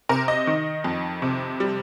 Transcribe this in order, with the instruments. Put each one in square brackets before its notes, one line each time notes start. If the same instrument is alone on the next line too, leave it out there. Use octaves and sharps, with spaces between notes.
[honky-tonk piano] C3 A#4
D#5
D#3
F2
C3
G3